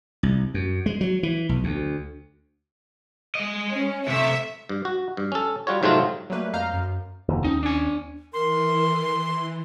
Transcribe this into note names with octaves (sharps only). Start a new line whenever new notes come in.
C2
F#2
G#3
F#3
E3
B1
D2
G#3 D#5
C#4
C3 A3 E5
G2
F#4
G2
C#4 A4
G3 F4 F#4 C#5
G#2 C3 F#3 A3 C4 F4
F#3 G3 A3 A#3 B4
F2 D#5 F5 A#5 F6 G6
F#2
F1 D#2
D#2 C#4 D#4
D4 G#5
E3 A#4 C6